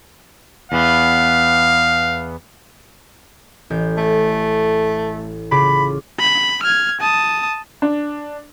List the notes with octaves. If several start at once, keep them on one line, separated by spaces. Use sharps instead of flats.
E2 E3 B3 F5
A1 G6
A3
C#3 F4 B5 D6
B5
F6 G#6
A5 D#6
D4